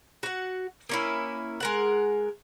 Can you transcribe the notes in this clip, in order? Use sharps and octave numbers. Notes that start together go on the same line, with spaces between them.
F#4 F#5
A#3 C#4 E4
G#3 A#4 F#5